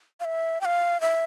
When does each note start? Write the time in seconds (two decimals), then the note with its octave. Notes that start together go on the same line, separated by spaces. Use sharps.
0.20 F5
0.25 E5
0.61 G5
0.65 F5
1.01 E5